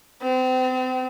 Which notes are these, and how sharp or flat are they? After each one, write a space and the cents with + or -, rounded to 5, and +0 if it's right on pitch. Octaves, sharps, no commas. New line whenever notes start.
C4 -35